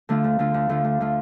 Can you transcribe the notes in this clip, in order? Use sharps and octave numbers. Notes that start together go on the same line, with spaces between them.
D3 A3 F4
D2
D3 A3 F4
D2
D3 A3 F4
D2
D3 A3 F4